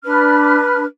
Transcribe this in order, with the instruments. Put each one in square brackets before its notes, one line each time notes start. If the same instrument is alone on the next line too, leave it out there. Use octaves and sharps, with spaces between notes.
[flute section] D4 B4 F6